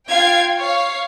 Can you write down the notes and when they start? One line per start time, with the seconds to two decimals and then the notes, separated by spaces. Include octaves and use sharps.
0.10 F4 F5 G5 G#6
0.57 C#5 F5